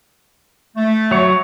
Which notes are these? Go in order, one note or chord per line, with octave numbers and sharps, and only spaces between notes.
A3
F#3 C#5